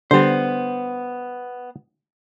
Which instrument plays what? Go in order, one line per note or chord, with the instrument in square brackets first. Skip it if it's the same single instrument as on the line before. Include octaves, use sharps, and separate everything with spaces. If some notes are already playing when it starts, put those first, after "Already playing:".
[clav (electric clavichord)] D3 G3 [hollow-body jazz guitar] B3 C5